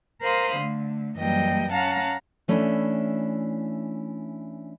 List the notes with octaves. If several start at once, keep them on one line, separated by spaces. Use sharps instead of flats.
A#4 C5 F5 B5 C6 D#6
D3 A3
F#2 E3 G3 A#3 D#5 G5
C#4 F5 F#5 A5 A#5
E3 A3 C#4 D4 E4